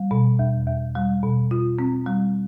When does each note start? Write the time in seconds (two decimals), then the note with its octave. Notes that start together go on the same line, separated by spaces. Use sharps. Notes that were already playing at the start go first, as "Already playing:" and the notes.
Already playing: G3
0.11 B2
0.39 E2
0.67 E2
0.95 G3
1.23 B2
1.51 F4
1.79 C4
2.06 G3